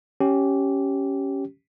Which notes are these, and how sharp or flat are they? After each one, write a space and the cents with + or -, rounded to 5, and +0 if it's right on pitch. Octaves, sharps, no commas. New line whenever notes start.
C#4 +0 G4 -15